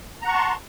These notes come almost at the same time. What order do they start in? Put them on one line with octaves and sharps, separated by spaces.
A#5 F#5 C#6 A5 C6